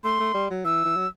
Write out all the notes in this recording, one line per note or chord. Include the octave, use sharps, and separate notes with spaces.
A3 C6
A3
G3
F#3
E3 E6
E3
F#3